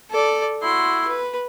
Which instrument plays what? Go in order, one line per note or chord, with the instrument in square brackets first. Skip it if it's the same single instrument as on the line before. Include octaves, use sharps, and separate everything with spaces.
[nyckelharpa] A4 D5
[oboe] E4 [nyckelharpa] F#4 C6
[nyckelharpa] B4